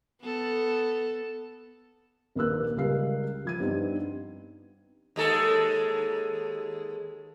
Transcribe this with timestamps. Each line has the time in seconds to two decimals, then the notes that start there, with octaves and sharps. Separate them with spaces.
0.22 B3 A4
2.35 A#1 D#2 A#3 B4 E6 F#6
2.77 C#2 G3 A#4 F5 C7
3.45 F3 G#6 D#7
3.60 G2 B3 C4 D#4
5.16 D#2 G#3 A4